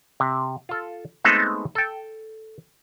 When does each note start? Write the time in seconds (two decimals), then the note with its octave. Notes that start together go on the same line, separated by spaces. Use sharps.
0.20 C3
0.69 F4 A4
1.24 G#3 A3 B3 C4 D#4 A4
1.75 A4 G5